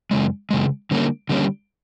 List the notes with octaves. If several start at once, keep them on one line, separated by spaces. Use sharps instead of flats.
F#2 C#3 G#3
F#2 C#3 G#3
D3 G3 A#3 C#4
D3 G3 A#3 C#4